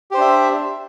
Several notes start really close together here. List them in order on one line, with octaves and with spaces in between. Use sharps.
G4 C5 D4 E5